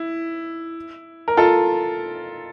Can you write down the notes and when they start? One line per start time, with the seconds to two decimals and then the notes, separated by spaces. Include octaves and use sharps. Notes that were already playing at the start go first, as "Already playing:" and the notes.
Already playing: E4
1.28 A#4
1.37 F4 A4